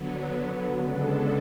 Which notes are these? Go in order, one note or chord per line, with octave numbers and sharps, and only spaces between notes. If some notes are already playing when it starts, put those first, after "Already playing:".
Already playing: D3 F#3 B3
C#3 G#3 B3 D4 A4